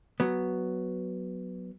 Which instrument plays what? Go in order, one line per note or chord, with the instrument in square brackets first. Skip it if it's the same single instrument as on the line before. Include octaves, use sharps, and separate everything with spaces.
[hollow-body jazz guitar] F#3 B3